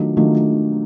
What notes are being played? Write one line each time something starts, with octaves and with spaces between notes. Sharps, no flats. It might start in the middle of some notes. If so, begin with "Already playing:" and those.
Already playing: D#3 F#3 A3 D4 F4
D#3 F#3 A3 D4 F4